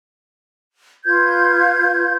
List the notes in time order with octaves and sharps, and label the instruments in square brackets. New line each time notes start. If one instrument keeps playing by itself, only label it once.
[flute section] F4 B4 G6 G#6